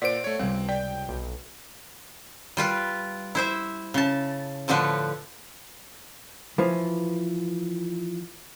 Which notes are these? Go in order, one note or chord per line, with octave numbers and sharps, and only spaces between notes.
A#2 C5 D5 F#5 D7
A3 C#5
C#2 C3 G3 C4
D5 G5
B1
G3 F4 B4
E4 C5 E5
C#3 A5
A2 D3 F3 D4 B4
E3 F3